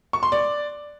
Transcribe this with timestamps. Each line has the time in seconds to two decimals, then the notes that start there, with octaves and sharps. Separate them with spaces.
0.13 C#6
0.23 C6
0.32 D5